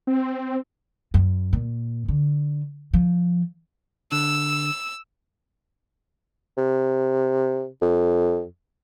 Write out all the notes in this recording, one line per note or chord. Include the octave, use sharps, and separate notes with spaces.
C4
F#2
A#2
D3
F3
D3 E6
C3
F2